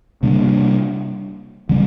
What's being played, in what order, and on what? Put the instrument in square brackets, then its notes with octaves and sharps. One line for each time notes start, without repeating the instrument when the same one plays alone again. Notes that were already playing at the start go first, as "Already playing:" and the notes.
[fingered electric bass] C3 G3 A#3 D4
D3 G3 C4